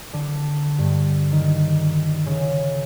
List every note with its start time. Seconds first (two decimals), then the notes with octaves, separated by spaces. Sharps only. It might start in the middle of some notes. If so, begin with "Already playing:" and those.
0.13 D3
0.79 G2
1.32 D#3
2.26 C#3